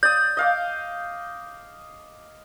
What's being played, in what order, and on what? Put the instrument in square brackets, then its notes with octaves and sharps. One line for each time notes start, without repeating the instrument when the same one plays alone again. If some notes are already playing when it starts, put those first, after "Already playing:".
[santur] D5 D#6 [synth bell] G6
[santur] D#5 F5 D6